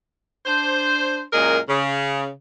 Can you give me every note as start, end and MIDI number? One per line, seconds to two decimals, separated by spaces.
0.46 1.22 62
0.46 1.22 72
1.33 1.58 42
1.33 1.58 46
1.33 1.58 56
1.33 1.58 68
1.33 1.58 70
1.67 2.29 49